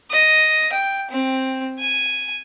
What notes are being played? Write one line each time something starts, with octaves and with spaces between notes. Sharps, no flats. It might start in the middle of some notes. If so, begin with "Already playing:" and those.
D#5
G5
C4
G#5